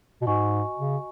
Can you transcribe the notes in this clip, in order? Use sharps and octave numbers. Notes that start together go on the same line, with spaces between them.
B2
G#2 F#4 D#5 G#5 C#6
C#3